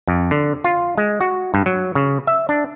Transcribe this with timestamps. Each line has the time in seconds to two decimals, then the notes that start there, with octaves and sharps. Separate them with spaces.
0.08 F2
0.31 D3
0.64 F4
0.98 G#3
1.21 F#4
1.54 G2
1.66 F#3
1.95 C#3
2.27 E5
2.49 D4